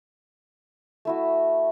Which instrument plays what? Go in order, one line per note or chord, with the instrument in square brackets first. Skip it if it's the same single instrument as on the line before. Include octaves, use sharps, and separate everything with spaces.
[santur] A3 E4 F#4